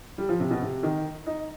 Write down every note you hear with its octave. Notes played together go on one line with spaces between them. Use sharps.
G3
F3
C3
B2
C3
D#3
D#4